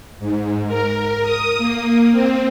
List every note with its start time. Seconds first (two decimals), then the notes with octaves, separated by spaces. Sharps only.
0.19 G#2
0.67 A#4
1.22 D#6
1.58 A#3
2.11 C4